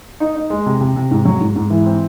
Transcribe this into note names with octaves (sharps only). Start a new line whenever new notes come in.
D#4
D#4
G#3
C3
C3
C3
G#2
F#3
G#2
G#2
E3
C4